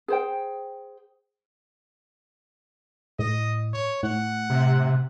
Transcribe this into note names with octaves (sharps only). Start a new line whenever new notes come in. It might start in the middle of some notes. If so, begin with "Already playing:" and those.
G#4 C5 G5
A2 D#5
C#5
A2 F#5
C3